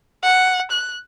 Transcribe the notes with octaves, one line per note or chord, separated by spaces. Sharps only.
F#5
F#6